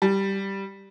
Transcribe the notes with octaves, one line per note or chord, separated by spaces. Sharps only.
G3